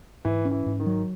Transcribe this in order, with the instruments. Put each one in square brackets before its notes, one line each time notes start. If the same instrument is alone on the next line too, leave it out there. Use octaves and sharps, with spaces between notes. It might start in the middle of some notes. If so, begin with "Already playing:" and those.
[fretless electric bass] G#2 [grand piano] E3
[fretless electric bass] C#4
[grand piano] E3
[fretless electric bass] G#2
[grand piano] D#3
[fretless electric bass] F#3